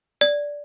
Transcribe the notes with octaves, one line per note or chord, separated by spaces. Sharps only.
D5